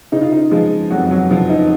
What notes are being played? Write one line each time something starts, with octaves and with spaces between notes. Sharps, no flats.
C#3 D#4
F4
D#4
F3 G#3 F4
F2 F#3 F#4
F#3 F#4
C#3 F3 F4
D#4